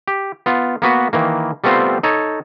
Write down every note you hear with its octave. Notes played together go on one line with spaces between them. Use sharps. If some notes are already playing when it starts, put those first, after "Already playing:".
G4
B3 F4
A#3 B3 F#4 B4
D#3 E3 A#3
G3 A3 B3 C4 F4 C5
D#4 A4 C#5